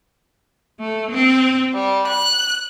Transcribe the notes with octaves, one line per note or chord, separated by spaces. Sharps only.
A3
C4
G3
F#6